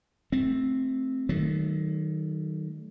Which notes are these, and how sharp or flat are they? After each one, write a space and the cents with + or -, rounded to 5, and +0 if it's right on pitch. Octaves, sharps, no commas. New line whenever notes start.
A3 -10 C4 +0
D#3 +0 F#3 +30 A3 -25